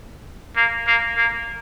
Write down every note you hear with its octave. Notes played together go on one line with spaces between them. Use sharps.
A#3
A#3
A#3